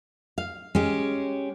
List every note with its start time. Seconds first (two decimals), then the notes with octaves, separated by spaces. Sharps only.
0.38 F5
0.75 G#3 C#4 G4